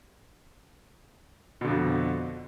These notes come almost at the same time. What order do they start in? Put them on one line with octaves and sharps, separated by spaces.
B2 D3 F2